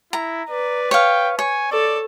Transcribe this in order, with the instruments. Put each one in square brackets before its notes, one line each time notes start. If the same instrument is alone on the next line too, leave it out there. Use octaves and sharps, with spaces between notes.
[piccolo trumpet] E4 [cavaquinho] A#5
[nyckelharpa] B4 [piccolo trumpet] D5
[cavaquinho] C#5 F5 [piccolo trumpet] G5
[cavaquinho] C#5 [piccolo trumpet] G#5
[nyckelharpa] A4 [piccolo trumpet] D5